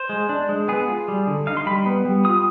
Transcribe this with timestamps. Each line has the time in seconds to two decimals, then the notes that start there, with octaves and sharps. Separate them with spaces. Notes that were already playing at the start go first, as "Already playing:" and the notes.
Already playing: C5
0.09 G#3
0.29 D4
0.49 G#3
0.68 B3 G#4
0.88 F4
1.08 G3
1.27 D3
1.47 D#4 F5
1.57 C6
1.66 G3 B5
1.86 B3
2.05 G3
2.25 F4 D#6